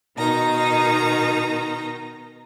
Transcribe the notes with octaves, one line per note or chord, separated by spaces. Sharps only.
B2 D#3 D#4 A#5